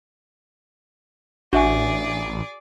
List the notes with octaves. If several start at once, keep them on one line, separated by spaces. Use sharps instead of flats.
A1 D4 F#4 G#4 D5 E5 G#5